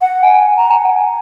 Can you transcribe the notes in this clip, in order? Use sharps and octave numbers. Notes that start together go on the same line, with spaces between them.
F#5
G#5
A#5
F#5
G#5